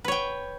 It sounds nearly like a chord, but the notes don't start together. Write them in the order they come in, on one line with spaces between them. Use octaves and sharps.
B4 C#5 G5